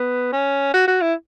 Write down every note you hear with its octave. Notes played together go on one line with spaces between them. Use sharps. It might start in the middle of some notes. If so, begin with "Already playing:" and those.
Already playing: B3
C#4
F#4
F#4
E4